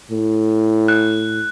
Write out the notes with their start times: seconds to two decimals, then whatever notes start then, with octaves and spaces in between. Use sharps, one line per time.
0.11 A2
0.88 F#6